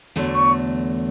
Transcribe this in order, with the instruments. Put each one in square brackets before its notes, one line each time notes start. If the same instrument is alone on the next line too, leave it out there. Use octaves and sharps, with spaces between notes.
[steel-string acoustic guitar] E2 D3 F#3 A3
[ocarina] C#6